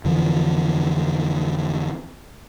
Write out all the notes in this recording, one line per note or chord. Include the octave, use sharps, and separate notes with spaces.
F2 D3 E3 F3